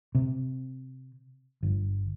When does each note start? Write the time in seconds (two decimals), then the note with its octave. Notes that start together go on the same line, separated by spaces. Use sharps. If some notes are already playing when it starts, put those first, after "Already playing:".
0.15 C3
1.63 G1